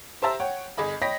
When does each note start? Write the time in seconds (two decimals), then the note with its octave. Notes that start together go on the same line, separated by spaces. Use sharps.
0.22 G4 C5 E5 A5 A#5 E6
0.40 C#5 F#5 G5
0.77 G1 G#4 D#5 B5
1.02 C#5 D#5 G5 B5 A#6 B6